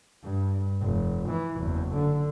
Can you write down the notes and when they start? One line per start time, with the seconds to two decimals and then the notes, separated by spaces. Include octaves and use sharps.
0.23 G2
0.81 F1
1.29 E3
1.58 F#1 E2
1.94 D3